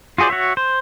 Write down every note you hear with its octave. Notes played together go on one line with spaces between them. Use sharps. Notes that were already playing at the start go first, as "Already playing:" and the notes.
F4 F#4 G#4 C5 D5
F#4 C#5 E5
C5